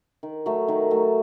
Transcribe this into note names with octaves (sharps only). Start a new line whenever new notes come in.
D#3
F#3 A3
D#3
F#3 A3